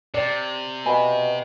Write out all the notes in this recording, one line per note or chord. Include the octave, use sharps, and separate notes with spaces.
C3 D5
B2 E5 G#5 B5